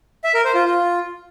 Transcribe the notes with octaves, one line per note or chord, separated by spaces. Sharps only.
E5
A#4
C5
F4
F4